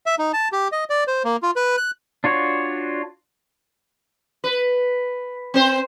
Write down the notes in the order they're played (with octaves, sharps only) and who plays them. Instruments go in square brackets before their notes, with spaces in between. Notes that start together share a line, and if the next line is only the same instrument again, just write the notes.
[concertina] E5
D#4
A5
G4
D#5
D5
C5
A#3
F4
B4
F#6
[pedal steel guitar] D4 F4 F#4 C#5
[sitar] B4
C4 C5